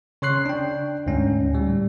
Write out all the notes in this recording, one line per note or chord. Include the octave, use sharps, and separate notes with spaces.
C#3 C#5 C6 F#6 C7
D4 G5
D2 G#2 C#4
A2 G3